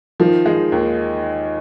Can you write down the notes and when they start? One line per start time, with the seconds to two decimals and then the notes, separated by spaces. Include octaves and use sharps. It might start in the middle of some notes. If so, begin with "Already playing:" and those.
0.20 D#3 F3
0.46 G#3
0.72 D#2